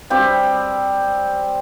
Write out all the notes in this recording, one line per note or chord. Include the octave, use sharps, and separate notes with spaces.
G3 C4 G4